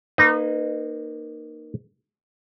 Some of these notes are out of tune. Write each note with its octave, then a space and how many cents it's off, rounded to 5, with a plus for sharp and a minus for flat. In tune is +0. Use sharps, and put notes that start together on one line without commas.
A#3 +0 D#4 -25 B4 +30